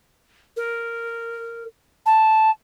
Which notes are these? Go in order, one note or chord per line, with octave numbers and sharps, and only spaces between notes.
A#4
A5